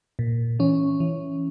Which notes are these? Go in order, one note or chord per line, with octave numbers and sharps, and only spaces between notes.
A#2
E3 C#4
E3